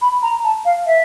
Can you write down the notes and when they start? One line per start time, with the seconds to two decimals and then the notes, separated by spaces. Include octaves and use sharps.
0.02 B5
0.23 A#5
0.44 A5
0.65 F5
0.86 E5